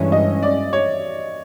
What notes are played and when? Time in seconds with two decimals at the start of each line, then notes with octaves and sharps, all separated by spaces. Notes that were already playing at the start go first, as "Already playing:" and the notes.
Already playing: G2 E3 G#3 C#4 E5
0.12 D#5
0.43 D5
0.73 C#5